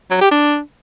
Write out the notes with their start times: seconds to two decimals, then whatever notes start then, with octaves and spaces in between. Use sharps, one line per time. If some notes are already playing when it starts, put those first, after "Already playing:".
0.11 F#3
0.21 G4
0.31 D4